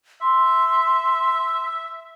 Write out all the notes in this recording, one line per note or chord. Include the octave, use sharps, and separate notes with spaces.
E5 C6